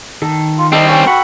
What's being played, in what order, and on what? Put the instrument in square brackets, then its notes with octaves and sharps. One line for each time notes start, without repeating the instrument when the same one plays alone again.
[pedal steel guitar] D#3 [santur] A4
[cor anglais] F4
[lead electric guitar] G3 C4 [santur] A4 [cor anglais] D#5
[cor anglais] C#4 [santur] G5
[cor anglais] F#4 [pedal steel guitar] A#4 F#5 B5